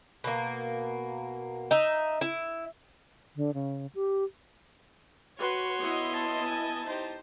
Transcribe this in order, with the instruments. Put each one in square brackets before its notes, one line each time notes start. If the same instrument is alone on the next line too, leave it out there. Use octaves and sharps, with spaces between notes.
[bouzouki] B2 A#3
D#4 E5
E4
[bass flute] D3
C#3
G4
[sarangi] F#4 [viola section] B4 [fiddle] C#5 C6
[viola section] B3 E4 D#5
[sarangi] A5
[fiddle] G#5
[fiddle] D#4 G4 [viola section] C5